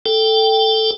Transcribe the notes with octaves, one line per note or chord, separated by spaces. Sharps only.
A4 G5